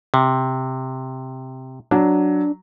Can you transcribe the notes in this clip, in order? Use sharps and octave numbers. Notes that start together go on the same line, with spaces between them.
C3
F#3 D4